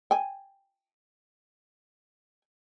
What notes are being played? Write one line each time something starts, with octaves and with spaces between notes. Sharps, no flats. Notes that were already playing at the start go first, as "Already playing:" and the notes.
G5 G#5